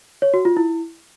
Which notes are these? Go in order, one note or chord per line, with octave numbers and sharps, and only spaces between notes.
C#5
F#4
F4
E4